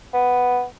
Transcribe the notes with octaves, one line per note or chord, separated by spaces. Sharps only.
B3